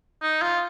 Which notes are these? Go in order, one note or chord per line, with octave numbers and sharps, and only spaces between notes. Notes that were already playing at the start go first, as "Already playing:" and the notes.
D#4
F4